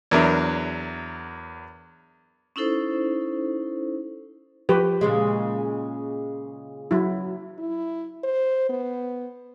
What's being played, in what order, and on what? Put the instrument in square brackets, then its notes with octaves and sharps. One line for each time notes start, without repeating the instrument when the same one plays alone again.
[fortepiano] E2 F#3 D4 A#4 E5
[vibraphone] C#4 D#4 E4 A4 C5
[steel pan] F3 G4 B4
[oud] A#2 C#3 G#3
[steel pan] F#3 E4
[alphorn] E4
C5
B3